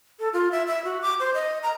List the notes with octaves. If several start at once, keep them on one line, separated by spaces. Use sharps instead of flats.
A4
F4
E5
E5
F#4
D6
C5
D#5
A#5